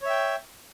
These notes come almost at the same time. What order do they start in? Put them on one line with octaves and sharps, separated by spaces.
C#5 E5 G5